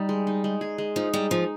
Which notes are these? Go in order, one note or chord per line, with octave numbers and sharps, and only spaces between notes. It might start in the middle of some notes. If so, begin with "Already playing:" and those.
Already playing: G3 D#4
G#3
D#4
G#3
G#4
G#3
F3 D#4
G3 G#3
F3 D#4